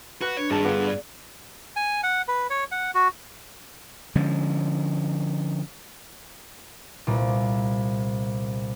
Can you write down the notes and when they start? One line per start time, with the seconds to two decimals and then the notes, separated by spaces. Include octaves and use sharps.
0.21 F#4 B4 F#6
0.37 D4 C#5
0.50 G#1 G2 G#4 A5
0.64 D3 B3 F4
0.86 D5
1.76 G#5
2.03 F#5
2.28 B4
2.50 C#5
2.71 F#5
2.95 F#4
4.15 D3 F3 G#3 C#4
7.07 C2 A#2